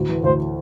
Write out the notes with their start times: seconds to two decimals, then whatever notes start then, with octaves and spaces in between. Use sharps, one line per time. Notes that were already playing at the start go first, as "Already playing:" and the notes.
Already playing: D2 A2
0.09 E3
0.24 D2 C5